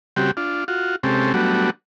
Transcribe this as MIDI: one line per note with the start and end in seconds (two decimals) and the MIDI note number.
0.16 0.31 49
0.16 0.31 55
0.16 0.31 60
0.16 0.31 66
0.16 0.31 67
0.37 0.64 62
0.37 0.64 65
0.68 0.96 65
0.68 0.96 66
1.03 1.33 48
1.03 1.33 56
1.03 1.33 60
1.03 1.33 61
1.03 1.33 67
1.03 1.33 69
1.34 1.70 54
1.34 1.70 55
1.34 1.70 57
1.34 1.70 59
1.34 1.70 62
1.34 1.70 66